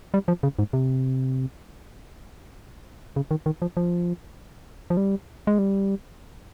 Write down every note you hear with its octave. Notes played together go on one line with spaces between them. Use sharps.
G3
F3
C#3
G#2
C3
C#3
D#3
D#3
F3
F3
F3
G3
G#3
G3